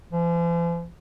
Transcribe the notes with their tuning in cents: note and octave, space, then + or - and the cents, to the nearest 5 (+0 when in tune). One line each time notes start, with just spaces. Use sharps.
F3 -45